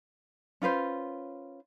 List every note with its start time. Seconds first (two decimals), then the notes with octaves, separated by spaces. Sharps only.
0.62 C#4 F4 B4 C5